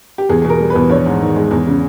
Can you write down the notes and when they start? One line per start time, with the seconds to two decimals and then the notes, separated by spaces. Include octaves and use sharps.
0.18 G4
0.29 E2 G#4
0.42 G#4
0.45 B2
0.50 A#4
0.60 G3
0.70 B4
0.75 E2
0.90 A#1 C#5
1.06 G#2
1.21 D#3
1.36 G#3
1.51 E2
1.67 C#3